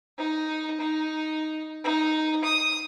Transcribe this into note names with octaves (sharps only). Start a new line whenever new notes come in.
D#4
D#4
D#4
D#6